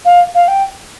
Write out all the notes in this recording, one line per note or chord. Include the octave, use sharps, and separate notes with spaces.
F5
F5
G5